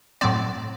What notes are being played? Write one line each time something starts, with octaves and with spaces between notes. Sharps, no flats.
A2 F#3 C4 D5